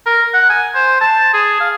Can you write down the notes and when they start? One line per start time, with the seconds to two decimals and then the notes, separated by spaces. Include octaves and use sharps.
0.06 A#4
0.34 F#5
0.49 G#5
0.75 C5
1.01 A5
1.33 G#4
1.60 F5